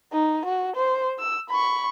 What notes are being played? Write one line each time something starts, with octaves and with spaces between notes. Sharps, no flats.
D#4
F#4
C5
E6
B5 C#6